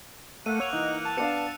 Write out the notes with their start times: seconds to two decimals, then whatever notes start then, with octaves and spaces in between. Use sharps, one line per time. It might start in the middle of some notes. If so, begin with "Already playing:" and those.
0.46 A3 A#3 F#5 D#7
0.60 C#5 E6 F#6 F7
0.73 E3 D#4
1.05 A5
1.17 B3 D4 F5 F#6 C#7